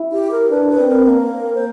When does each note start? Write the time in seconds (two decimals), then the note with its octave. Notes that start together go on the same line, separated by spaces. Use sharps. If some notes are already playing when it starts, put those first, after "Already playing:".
Already playing: E4
0.12 G4
0.31 A#4
0.50 D4 B4
0.69 B4
0.79 C4
0.88 A#4
1.08 A#3
1.55 C5